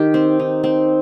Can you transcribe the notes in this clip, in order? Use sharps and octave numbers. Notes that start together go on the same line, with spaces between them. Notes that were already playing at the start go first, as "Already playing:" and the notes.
Already playing: D#3 G4
C4
D#4
C4